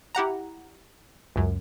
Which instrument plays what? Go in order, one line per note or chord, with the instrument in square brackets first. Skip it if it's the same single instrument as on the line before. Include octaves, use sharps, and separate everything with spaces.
[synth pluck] E4 G4 F#5 A#5
C#2 F#2